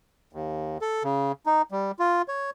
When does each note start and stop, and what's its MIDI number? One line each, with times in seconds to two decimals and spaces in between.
0.33 0.78 39
0.81 1.03 69
1.04 1.32 49
1.46 1.62 63
1.71 1.92 55
1.99 2.22 65
2.28 2.50 73